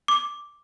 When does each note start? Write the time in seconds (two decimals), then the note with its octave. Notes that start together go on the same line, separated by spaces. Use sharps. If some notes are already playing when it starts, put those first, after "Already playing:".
0.08 D6